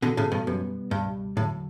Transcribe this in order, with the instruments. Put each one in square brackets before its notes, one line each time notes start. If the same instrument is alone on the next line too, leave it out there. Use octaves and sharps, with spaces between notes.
[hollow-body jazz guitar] B2 D3 [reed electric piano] E3 B3 F#4 A4
[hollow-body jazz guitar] A2 C#3
G2 B2
[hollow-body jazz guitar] F#2 [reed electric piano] B2 G3 B3
[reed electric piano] C#2 B2 G3 [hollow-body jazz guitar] G2
[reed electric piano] E2 D3 F#3 [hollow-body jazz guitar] A2